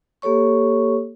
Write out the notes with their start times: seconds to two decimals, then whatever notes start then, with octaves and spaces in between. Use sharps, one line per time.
0.22 A#3 G4 A4 C#5 C#6